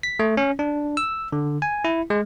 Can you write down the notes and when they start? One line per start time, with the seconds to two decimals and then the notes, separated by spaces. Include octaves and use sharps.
0.03 B6
0.19 A3
0.37 C#4
0.59 D4
0.97 E6
1.32 D3
1.62 G#5
1.85 E4
2.10 G#3